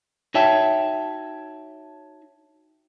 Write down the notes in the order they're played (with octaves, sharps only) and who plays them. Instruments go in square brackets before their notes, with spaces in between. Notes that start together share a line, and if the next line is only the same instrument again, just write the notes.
[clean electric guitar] D#4 F#4 C#5 E5 G5 A5